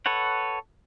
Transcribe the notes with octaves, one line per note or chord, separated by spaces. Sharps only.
A4 B4 C#5 F#5